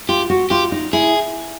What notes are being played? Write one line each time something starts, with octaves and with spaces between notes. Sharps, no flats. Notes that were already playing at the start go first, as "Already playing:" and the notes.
F4 G4
F#4
F4 G4
D#4
E4 G#4